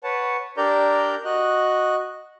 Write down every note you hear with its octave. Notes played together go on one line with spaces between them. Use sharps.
B4 C#5 F#5 A5
D4 G4 A#4 D5 A#5 G6
F#4 D#5 F#6